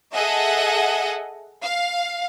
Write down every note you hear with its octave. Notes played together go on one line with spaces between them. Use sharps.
G#4 A4 D#5 E5 F#5
F5